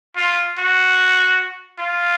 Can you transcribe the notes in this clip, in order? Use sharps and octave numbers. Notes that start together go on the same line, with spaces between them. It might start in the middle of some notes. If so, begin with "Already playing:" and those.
F4
F#4
F4